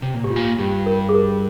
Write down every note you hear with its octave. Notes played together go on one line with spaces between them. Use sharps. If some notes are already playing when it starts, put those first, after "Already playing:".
C3
A#2
G#2 G4
F4
A#2
G2 G4
A#4
G#4
A#4